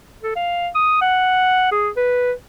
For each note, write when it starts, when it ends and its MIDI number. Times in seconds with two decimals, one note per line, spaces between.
0.23 0.35 69
0.36 0.69 77
0.75 1.01 87
1.02 1.70 78
1.72 1.90 68
1.97 2.32 71